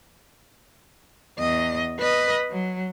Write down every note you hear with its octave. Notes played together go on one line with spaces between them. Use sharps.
E2 D#5
B4 D#5
F#3